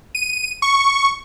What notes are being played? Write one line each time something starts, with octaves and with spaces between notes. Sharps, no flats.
D#7
C#6